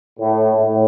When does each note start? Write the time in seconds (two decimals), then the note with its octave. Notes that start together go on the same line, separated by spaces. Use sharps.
0.19 A2
0.54 A2